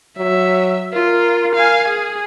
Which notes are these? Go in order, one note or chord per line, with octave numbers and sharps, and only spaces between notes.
F#3 E5
F4 A#4
F5 G#5
G#4